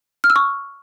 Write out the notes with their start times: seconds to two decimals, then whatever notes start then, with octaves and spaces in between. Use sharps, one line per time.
0.24 F6
0.30 E6
0.36 C#6